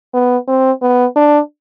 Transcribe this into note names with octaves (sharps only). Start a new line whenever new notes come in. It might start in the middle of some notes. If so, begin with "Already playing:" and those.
B3
C4
B3
D4